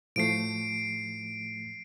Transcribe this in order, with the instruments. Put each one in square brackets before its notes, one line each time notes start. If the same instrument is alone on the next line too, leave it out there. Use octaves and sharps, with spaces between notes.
[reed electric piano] A2 F3 A3 [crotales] C7 D7